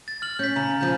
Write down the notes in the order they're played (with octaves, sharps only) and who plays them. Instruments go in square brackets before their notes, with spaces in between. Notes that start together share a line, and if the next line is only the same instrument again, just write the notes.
[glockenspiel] A6
F6 F#7
[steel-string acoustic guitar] C#4 [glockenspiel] G6 B6
[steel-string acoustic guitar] C#3 [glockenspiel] A#5
[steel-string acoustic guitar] C#3 F3 [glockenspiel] G6